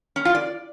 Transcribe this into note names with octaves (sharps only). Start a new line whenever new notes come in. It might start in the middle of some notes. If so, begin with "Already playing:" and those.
C#4
F4
D5